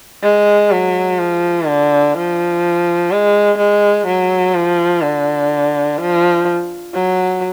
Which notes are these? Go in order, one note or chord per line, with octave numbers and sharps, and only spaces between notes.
G#3
F#3
F3
D3
F3
G#3
G#3
F#3
F3
D3
F3
F#3